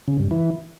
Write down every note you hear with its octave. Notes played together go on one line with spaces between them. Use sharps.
C#3
G2
E3